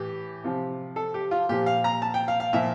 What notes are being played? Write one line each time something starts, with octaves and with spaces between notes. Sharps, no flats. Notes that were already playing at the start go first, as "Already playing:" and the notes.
Already playing: A2 E3 G4
C3 F3
A4
G4
F4
A#2 F3 G4
F5
A#5
A5
G5
F5
F5
A#2 F3 E5